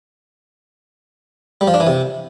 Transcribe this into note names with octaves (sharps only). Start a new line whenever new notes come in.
G3
F3
D4
E3
C3